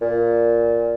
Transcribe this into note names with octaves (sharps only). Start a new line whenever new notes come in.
A#2